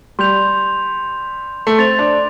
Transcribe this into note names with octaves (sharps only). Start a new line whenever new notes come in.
G3 C6 G6 F7
A3
C4 C6 A6 F7
D4